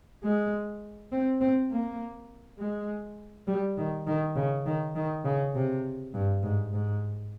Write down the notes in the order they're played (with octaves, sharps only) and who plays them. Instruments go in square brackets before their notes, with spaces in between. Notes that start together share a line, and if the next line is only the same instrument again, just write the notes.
[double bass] G#3
C4
C4
A#3
G#3
G3
D#3
D#3
C#3
D#3
D#3
C#3
C3
G2
G#2
G#2